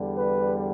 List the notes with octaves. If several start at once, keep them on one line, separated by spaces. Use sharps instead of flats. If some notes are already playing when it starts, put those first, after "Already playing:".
Already playing: E2 D3 G3
B4